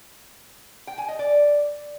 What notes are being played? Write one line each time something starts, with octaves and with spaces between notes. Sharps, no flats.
G5
G#5
D#5
D5